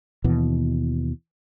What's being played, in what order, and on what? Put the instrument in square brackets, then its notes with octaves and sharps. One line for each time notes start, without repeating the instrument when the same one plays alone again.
[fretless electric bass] D#2 B2 E3